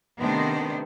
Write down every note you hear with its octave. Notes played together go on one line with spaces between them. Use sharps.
C3 D#3 A3 B3 D4 C5